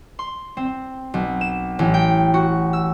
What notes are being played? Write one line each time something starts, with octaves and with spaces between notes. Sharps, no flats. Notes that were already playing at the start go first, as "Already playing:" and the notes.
C6
C4
B1
E7
A1
G5
F#4
E6